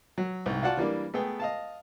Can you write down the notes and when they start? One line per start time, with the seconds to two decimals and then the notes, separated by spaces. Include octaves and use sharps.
0.18 F#3
0.46 C2 G#2 G5
0.63 F4 F#4 D5 F#5 A5
0.77 E3 G3 A#3 D4
1.14 A3 B3 G#4 G5
1.40 D#5 F5 A5